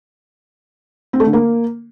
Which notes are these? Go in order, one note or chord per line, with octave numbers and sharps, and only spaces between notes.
C4
A3
D3
A#3